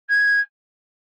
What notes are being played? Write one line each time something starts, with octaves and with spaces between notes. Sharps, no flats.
G#6